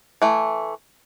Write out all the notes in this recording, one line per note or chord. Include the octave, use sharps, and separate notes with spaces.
E3 A3